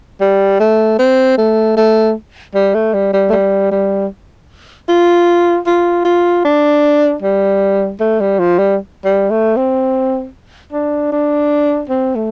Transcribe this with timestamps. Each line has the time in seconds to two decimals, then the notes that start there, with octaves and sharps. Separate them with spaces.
0.21 G3
0.60 A3
0.99 C4
1.38 A3
1.77 A3
2.55 G3
2.74 A3
2.94 G3
3.13 G3
3.29 A3
3.33 G3
3.71 G3
4.88 F4
5.66 F4
6.05 F4
6.45 D4
7.22 G3
8.00 A3
8.20 G3
8.39 F3
8.59 G3
9.05 G3
9.30 A3
9.56 C4
10.73 D4
11.12 D4
11.89 C4
12.15 A3